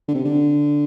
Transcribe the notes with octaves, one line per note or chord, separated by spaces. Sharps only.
D3
C3
D3